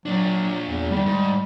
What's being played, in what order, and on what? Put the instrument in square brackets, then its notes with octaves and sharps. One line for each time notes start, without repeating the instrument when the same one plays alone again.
[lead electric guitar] A#2 D4 [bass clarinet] F#3
[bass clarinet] E2
[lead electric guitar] G2 D#3 [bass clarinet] G3
[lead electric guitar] G#2